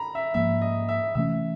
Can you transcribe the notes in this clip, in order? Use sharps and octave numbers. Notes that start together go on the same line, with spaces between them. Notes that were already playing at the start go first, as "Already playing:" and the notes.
Already playing: A#5 B5
E5
G#2 F3 A#3 E5
D#5
E5
C3 E3 A3 C#4 E5